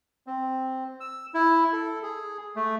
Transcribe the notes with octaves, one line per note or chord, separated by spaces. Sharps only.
C4
E6
E4
A4
G#4
A3